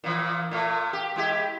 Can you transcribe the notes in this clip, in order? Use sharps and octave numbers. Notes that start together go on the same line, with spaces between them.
A#2 E3
A#2 A3
G4
G#3 E4 G4